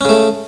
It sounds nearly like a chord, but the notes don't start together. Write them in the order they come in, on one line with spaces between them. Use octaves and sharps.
C#4 C#3 A3